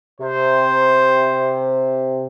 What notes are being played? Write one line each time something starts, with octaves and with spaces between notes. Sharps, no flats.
C3 C5